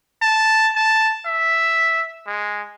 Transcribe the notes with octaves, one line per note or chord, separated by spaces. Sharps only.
A5
A5
E5
G#3